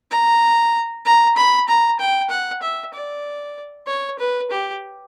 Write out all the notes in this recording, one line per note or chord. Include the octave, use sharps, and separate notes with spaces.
A#5
A#5
B5
A#5
G5
F#5
E5
D5
C#5
B4
G4